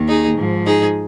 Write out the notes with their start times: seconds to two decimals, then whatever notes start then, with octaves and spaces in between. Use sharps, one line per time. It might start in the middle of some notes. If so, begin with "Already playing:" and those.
Already playing: D#2 D#3
0.08 D#4 G#4
0.37 G#2 F3
0.66 D#4 G#4